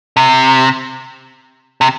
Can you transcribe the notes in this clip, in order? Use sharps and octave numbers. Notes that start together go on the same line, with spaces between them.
C3
C3